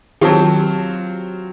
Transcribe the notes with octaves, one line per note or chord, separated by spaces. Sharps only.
D#3 F#3 C4 F4 G4 A5